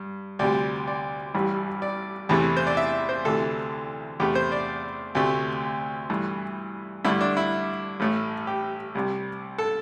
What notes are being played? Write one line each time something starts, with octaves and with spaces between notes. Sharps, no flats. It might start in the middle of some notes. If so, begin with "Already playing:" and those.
Already playing: G2
D2 C3 G3 D5
D5
A1 G2 E3 G3
D5
E2 C3 E3 A3
C5
D5
E5
C5
D2 C3 E3 A4
E2 C3 A3 G4
C5
D5
D2 C3 A3
G2 E3 A3
G2 D3 A3 E4
D4
E4
A1 A2 A3
G4
C2 C3 G3
A4